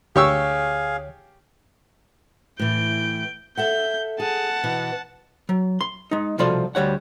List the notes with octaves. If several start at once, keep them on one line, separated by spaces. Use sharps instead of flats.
D2 G4 G#4 C#5 F5 C#6 E6
A2 E3 G6 D7
A4 E5 F#5 G6
G#4 F#5 A5
B2 E3 B3
F#3
C6
G#3 D#4
C2 B2 F3 F4 A4 D5
D2 G3 C#5 F#5